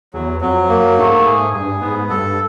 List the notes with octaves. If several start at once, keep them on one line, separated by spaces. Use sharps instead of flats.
E2 F#3
F2 F#3
F#2 A#3
G#2 A3
G#2 G#4
G2 G#4
G#2 B3
G2 A4